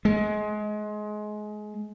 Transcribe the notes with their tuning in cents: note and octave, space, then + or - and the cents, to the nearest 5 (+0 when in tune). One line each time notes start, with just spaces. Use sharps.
G#3 +25